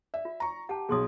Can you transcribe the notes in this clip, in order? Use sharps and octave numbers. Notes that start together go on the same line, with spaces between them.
D5 E5
F4
A#5 C#6
G4 F#5 A5 A#5
B1 B2 G#4 C6 D#6